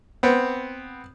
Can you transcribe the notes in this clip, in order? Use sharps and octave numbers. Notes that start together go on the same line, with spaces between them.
B3 C4